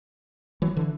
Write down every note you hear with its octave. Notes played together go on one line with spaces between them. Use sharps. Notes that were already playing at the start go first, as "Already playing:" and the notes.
E3 F#3
D3 E3